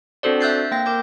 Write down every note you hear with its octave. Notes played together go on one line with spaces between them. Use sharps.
C4 D4 F#4 A4 C5 D5
E5 E6 F#6 G6 A6 C7
A#3 G5 A#6
A#4 D6 G6